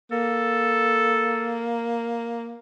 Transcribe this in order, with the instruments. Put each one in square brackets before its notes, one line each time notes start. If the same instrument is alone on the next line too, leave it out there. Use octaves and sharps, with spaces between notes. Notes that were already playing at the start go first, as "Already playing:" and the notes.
[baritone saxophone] A#3 [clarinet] A4